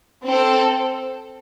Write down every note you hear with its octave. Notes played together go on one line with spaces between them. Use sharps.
C4 A4 C5